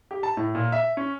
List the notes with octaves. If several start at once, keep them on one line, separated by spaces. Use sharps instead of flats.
G4
A5
A2
A#2
E5
C#4